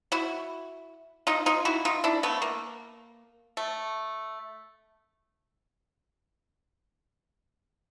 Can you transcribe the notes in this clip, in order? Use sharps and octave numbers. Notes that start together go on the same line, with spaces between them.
E4 F#4
D#4 F4
D#4 F4
E4 F#4
D#4 F4
D4 E4
A3 B3
A#3
A3